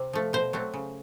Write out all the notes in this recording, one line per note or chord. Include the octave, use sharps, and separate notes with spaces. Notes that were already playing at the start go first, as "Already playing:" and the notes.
Already playing: C3 C4
F3 A3
B2 C5
F#3 A3 C4
C#3